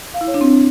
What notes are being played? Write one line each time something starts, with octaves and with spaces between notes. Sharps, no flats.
F5
E4
C#5
D4
C4